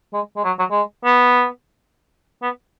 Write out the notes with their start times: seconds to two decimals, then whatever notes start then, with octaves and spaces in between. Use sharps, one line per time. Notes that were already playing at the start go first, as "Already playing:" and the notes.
0.13 G#3
0.36 G#3
0.44 F#3
0.59 F#3
0.71 G#3
1.04 B3
2.42 B3